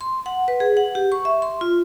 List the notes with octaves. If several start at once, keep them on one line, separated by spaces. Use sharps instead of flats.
C6
F#5
B4
G#4
F#5
G4
C#6
E5
C6
F4